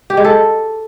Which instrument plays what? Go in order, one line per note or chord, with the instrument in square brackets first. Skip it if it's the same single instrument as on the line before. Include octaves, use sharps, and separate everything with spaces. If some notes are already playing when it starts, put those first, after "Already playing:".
[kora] G4
G#3
A4